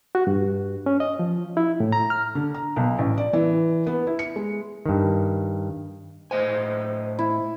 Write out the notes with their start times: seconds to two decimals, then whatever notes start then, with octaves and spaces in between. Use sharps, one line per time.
0.15 F#4
0.27 G2
0.86 C#4
1.00 D#5
1.19 F3
1.57 E4
1.80 A2
1.92 A#5
2.10 F6
2.35 D3
2.54 A#5
2.76 B1
2.99 A1
3.18 D5
3.33 E3
3.87 B3
4.07 E4
4.19 C#7
4.36 G#3
4.86 G2 D#3
6.31 A2 C5 D#5 G#5
7.19 E4